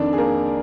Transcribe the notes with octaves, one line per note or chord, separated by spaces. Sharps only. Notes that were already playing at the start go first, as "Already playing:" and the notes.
Already playing: F2 D#3 D4 D5
G#4
A#3 A#4